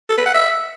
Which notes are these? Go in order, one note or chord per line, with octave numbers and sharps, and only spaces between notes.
A4
B4
F#5
E5